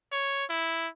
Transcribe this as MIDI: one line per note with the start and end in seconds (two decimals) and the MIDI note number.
0.12 0.45 73
0.50 0.88 64